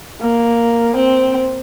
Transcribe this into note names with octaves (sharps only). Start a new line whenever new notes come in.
A#3
C4